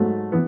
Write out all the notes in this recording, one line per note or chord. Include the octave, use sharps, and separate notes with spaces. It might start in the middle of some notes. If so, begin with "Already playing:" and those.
Already playing: G#2 F#3 A3
E3 B3